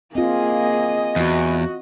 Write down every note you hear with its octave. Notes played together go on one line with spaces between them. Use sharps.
A#3 C4 F4 G#4 D#5
E2 F#4